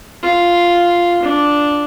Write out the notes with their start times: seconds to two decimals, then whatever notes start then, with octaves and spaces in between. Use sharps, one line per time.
0.23 F4
1.22 D4